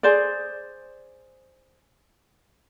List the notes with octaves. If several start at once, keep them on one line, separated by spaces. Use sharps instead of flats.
G#4 C5 D5